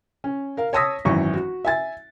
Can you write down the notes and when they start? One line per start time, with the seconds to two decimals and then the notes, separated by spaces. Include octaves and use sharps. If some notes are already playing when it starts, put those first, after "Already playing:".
0.24 C#4
0.57 A#4 F5
0.73 C#5 A5 D#6 E6 A#6 B6
1.05 G#1 F#2 E3 C#6
1.34 F#4
1.65 E5 G#5 A6